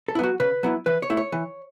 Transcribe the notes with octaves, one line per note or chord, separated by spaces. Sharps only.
A4
E4
F#3 B3 F#4
C#3 B4
F#3 B3 E4
E3 B4
C#5
A3 E4
C#5
E3